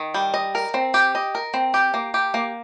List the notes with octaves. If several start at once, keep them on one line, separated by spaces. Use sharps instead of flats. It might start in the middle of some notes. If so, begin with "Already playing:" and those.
Already playing: D#3
G3
D#5
A#4
C4
G4
D#5
A#4
C4
G4
A#3
G4
A#3